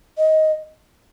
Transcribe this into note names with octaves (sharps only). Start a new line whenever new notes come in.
D#5